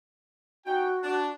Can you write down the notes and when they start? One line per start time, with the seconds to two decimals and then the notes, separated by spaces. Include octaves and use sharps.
0.66 C#4 D#4 F#4 G5
1.03 D4